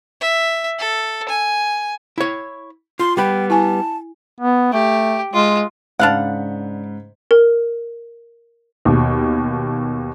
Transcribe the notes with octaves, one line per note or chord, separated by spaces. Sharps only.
E5
A4
G#5
E4 C#5
F4 C6
G3 B3 G5 B5
E4 G#5 A5
B3
A3 G4
G#3 F4
G#2 C#3 D4 F5 F#5 B5
A#4
D#2 B2